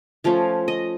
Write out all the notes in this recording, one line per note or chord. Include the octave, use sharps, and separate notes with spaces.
F3 A3 C#4 F5
D#5